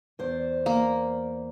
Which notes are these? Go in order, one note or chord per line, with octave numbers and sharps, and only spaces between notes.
E2 C5 D5
A#3